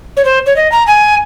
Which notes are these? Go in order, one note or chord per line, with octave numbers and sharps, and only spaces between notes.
C#5
C5
C#5
D#5
A#5
G#5